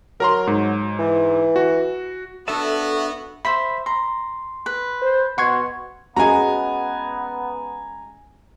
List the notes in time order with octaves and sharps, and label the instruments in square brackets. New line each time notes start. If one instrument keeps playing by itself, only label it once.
[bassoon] F#3 [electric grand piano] A#4 A#5 C6
[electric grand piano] G#2
[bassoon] E3
[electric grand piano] F#4
[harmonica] B3 F#4 [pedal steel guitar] D4 A5 [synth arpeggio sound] A4 E5
[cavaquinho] C5 E5 [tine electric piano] B5 B6
[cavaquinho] A#5 [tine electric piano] C6
[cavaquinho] B4
[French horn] C5
[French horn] B2 [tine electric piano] F#5 C#6 G#6 [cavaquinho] C6
[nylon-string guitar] G#3 C#4 F#4 [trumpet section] B3 [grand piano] G#5 A#5